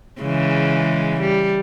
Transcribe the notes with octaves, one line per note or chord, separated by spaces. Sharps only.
C#3 E3 G#3
G3